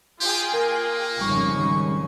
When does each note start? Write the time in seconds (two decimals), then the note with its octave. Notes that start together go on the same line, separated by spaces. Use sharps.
0.20 F4 G4 G#4 G5
0.54 A#3 A#4
1.21 G#1 F2 C#3 G3 C#6
1.57 D#3 G3